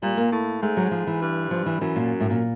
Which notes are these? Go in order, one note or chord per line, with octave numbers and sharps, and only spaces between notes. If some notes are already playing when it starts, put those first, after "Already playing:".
A#2 G3
A#3
A2
G#2 A3
F#3
F3
E3
G2
F3
E3
F#2 E3
A#2
A2
A#2